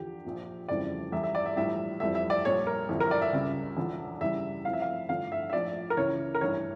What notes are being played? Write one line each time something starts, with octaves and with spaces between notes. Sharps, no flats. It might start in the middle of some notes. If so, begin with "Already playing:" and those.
Already playing: E2 D3 F3 G4
A#1 A#2 F3
F1 F2 C#3 E3 G3 D5
E2 E3 G3 E5
E5
D5
E5
A#1 A2 E3 G3 E5
F1 F2 E3 G3 E5
E5
D5
A#1 A#2 G3 C#5
A#4
G1 F2 E3 G3
A#4
D5
E5
C#2 C#3 G3
E1 E2 D3 F3
E2 C#3 E3 G3 E5
F1 F2 E3 F5
E5
F5
A1 G2 D3 F3 F5
E5
E5
A#1 A2 F3 D5
A#4
C#2 C#3 E3 C#5
A#4
A1 G2 E3 C#5